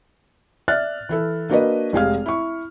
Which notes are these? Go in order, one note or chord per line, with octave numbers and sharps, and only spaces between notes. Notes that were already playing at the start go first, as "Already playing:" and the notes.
D5 E5 F6 F#6 A6
E3 E4 A4
A#3 D4 F#4 A#4 B4 D#5
F1 G#3 G4 G#4 F5 F6
E4 C#6